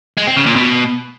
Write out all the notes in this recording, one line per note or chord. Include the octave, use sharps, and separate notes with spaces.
G#3
C4
C#3
A#2
B2